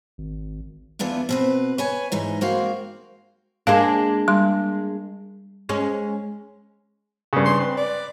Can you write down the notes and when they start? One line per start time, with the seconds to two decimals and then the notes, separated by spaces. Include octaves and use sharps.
0.18 G#1
0.99 E2 B3 D4 E4 F4
1.29 B2 C4 B4
1.78 B4 C#5 G#5
2.12 G#2 E3 D#4
2.41 G#3 A#3 C4 F#4 C5 F5
3.67 G#3 A#3 D4 F5
4.28 G3 C6
5.69 G#3 C#4
7.33 G2 C#3
7.46 C6
7.60 C4 B4
7.77 D5